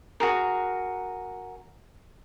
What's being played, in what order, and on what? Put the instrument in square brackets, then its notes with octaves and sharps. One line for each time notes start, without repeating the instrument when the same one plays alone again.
[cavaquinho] F#4 G#4 A#4